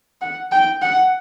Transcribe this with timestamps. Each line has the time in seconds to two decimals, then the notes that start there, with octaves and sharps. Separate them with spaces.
0.21 F#5
0.52 G5
0.82 F#5